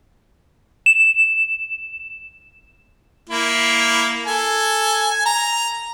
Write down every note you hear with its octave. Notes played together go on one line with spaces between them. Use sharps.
E7
A#3 E4
A4 G#5
A#5